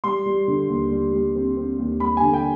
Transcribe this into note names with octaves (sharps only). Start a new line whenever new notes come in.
G3 C6
G3
D3
D#2
G3
G3
C4
C4
D#2
G3 B5
G#5
D3
G5